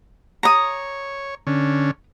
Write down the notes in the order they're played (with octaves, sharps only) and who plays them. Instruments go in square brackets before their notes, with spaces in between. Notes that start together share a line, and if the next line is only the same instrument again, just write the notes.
[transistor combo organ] C#5 [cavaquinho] A#5 D#6
[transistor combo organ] D3 C#4